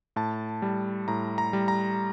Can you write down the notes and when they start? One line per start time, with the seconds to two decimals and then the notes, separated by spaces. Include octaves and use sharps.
0.16 A2 A5
0.62 G3
1.08 A2 A#5
1.38 A#5
1.53 G3
1.68 A#5